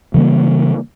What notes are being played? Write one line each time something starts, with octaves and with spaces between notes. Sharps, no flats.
C#3 E3 G3 A#3